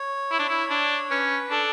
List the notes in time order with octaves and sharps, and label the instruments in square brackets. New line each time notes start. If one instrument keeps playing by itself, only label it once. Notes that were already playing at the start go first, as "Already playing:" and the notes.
Already playing: [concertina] C#5
[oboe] E4
D4
E4
D4
[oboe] C#4 [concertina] B4
[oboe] D4 [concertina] A4